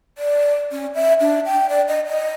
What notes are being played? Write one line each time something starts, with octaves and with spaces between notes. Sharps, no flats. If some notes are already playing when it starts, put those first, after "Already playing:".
D5
C#4
E5
D4
G5
D5
D#5
D#5